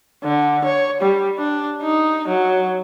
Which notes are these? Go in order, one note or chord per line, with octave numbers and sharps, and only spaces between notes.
D3
C#5
G3
D4
D#4
F#3